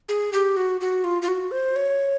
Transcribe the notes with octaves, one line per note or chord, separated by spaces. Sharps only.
G#4
G4
F#4
F#4
F4
F4
F#4
C5
C#5